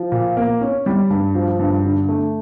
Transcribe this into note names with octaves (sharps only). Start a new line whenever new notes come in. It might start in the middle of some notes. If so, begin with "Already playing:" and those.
Already playing: F3
A#2
A#3
C#4
G3
G2
F3
G2
D3
A3